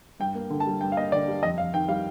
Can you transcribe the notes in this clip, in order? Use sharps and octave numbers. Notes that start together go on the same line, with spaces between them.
G2 G5
A#3
D3
A5
G3
G2 G5
F5
A#3 D#5
D3 D5
G3
F2 D#5
F2 F5
D#3 G5
G3 F5